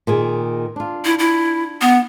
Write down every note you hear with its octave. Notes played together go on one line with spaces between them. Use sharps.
A#2 D#3 G#4
D4 F4
E4
E4
B3